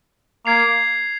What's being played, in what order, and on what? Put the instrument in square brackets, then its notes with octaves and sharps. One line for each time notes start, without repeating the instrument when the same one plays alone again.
[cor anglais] A#3 [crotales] G#6 C7 F7